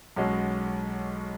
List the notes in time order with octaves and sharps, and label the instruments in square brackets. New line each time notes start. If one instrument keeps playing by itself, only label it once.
[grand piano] B1 B2 G#3 C#4 F#4